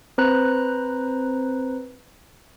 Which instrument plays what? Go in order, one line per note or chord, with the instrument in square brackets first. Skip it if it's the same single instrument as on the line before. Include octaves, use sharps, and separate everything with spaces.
[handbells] C4 B4 C5 A#5 F#6